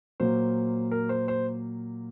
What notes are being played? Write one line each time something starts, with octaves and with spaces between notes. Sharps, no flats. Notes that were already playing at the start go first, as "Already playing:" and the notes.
A#2 F#3 A#3 C5
A#4
C5
C5